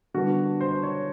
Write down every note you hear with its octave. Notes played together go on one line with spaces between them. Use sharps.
D3 G3 B3 D4 F#4
C5
C#5